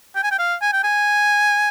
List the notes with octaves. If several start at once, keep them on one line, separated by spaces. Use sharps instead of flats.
G5
G#5
G5
F5
G#5
G5
G#5